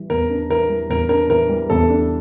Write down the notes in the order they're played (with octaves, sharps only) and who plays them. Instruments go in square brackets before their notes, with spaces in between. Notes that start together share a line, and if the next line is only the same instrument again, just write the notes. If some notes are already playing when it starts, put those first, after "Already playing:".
Already playing: [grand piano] E3 G3
[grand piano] E2 [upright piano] A#4
[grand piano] D4
[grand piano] E3 [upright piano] A#4
[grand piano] G3
[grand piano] E2 [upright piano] A#4
[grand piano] D4 [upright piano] A#4
[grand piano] E3 [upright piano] A#4
[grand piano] G3
[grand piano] E2 [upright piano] A4
[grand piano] D4